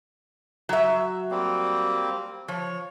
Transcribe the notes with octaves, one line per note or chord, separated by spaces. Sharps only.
F#3 E5
G3 A#3 C4
F3 C#5